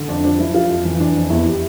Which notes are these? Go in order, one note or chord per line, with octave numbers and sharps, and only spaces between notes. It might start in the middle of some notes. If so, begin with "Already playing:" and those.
Already playing: D3
F2 D4
F3 D4
F3 E4
F3 F4
F2
E3
E3 D4
F2
E2 E4
G4